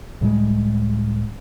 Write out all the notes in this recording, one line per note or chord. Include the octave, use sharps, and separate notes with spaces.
C#2 A2 G3 G#3